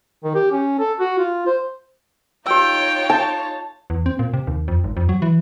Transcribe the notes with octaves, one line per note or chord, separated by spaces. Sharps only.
D#3
G4
C#4
A4
F#4
F4
C5
D#4 F4 G4 C#5 G5 E6
A5
E2
C4
A#2
C3
D#2
F2
G#1
F2
F#3
E3